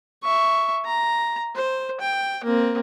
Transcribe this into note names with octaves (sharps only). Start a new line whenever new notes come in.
E5 C#6
A#5
C5
G5
A#3 C4